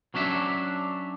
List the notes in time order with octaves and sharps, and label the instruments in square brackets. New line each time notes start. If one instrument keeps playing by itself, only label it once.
[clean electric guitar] F#3 C#4 D4 E5